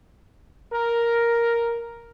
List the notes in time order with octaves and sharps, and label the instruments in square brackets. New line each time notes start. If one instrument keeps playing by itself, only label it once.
[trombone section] A#4